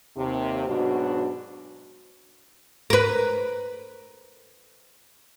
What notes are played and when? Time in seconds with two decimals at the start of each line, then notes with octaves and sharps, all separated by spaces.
0.17 D#2 C3
0.68 G#2 B2 F#3 D4 F#4
2.90 A#4 B4